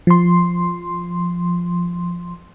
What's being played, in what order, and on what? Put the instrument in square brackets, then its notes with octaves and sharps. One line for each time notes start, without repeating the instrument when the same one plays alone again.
[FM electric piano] F3 C6